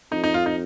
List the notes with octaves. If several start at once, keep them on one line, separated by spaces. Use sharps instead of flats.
F2 D#4
D#4
F4
D#4